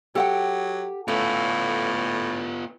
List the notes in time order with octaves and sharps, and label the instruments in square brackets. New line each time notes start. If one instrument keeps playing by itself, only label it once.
[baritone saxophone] F#3 [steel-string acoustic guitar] G4 [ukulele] A4 F#5 G5
[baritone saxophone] A2 [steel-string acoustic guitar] A3 C#4 [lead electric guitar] B3 F4